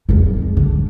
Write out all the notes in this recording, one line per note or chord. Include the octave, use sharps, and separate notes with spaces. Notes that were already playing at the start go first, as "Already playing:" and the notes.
F2 G#3
D3